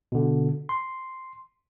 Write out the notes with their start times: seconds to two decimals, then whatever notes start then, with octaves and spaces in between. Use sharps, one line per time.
0.12 B2 D3
0.69 C6